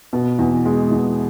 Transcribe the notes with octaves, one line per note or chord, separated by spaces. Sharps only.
B2
E2
G#3
E2